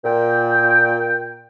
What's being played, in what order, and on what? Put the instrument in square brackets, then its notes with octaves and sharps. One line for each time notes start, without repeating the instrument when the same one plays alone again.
[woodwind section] A#2 G5